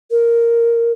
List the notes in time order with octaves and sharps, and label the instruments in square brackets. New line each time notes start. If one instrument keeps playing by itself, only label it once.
[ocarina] A#4